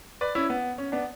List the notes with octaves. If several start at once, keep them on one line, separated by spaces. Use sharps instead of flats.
B4 D5
C#4 E4
B3
C#4
B3 D4